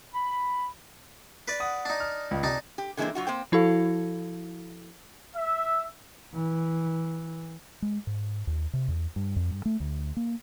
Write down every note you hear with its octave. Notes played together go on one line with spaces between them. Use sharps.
B5
B4 D5
F#5 D#6
D4 D#4
F6
C#2
C3 D4 D#4
G4
D3 E3 G#3 A#3 C4 D4
F#3 F4 F#4
A#3 C4 G5
F3 E4 F#4 A4 F5
E5
E3
G#3
G#2
D#2
C3
E2
G2
F2
G2
A3
D2
A#3